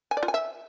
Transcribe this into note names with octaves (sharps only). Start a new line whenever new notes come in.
G#5
D5
F4
G#5
E5